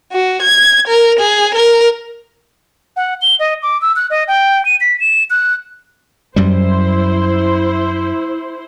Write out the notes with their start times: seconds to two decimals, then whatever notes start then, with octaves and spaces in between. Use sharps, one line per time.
0.12 F#4
0.42 G#6
0.88 A#4
1.19 G#4
1.55 A#4
2.96 F#5
3.22 G7
3.40 D#5
3.63 D6
3.82 E6
3.96 F#6
4.10 D#5
4.28 G5
4.65 D#7
4.81 B6
5.00 E7
5.30 F#6
6.36 F#2 G3 E4 C5